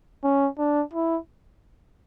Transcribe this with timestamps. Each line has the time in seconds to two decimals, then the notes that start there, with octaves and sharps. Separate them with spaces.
0.24 C#4
0.59 D4
0.93 E4